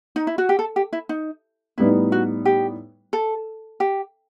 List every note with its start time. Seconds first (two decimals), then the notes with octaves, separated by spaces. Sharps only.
0.16 D#4
0.27 E4
0.38 F#4
0.49 G4
0.59 A4
0.76 G4
0.93 E4
1.09 D#4
1.78 A2 G3 B3 D#4 E4
2.12 F#4
2.46 G4
3.13 A4
3.80 G4